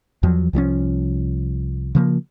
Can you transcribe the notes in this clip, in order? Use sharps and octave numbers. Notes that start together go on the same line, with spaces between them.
E2 F3 F#3
C2 F3 G3 C#4
C#3 F3 A#3